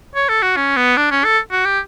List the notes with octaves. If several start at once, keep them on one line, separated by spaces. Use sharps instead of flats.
C#5
A4
F#4
C#4
B3
D4
C#4
A4
F#4
G4